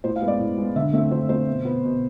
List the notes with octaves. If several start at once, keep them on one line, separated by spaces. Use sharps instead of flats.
A2 C5
F5
G#3 B3
D5
A2
G#3 B3
D3 E5
A3 C4 E5
D3 C5
A3 C4 C5
B2
B3
B2